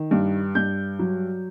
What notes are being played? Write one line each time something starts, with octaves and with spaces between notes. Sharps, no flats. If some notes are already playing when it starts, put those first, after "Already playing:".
Already playing: D#3
G2
G2 G6
F#3